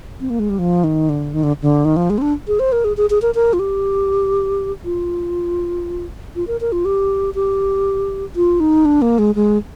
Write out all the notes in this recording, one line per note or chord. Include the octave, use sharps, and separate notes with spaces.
C4
A#3
G#3
G3
F3
D#3
D3
D#3
D3
D3
D#3
F3
G#3
C4
D4
G#4
C5
A#4
G#4
G#4
G#4
A#4
A#4
F4
G4
F4
F4
A#4
A#4
F4
G4
G4
F4
D#4
D4
A#3
G#3
G#3